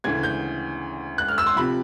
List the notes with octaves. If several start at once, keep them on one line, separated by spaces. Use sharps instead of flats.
D2 C#3 E3 G#6
G6
F#6
F6
E6
C6
C3 F3 B5